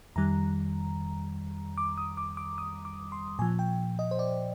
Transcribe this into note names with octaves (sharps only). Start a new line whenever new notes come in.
F2 D#3 G3 A#5
D6
D#6
D6
D6
D#6
D6
C6
A#2 F3 G#5
G5
D#5
C5
D5